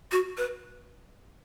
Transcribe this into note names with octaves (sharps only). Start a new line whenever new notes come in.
F#4
B4